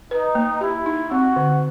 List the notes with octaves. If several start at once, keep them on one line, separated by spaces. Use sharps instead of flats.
D#4 B4
A#3
E4 G4
D#4
C4 F#4
D3